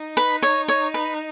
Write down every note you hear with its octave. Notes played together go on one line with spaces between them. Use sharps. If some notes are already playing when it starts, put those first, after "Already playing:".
Already playing: D#4
B4
C#5
C#5
B4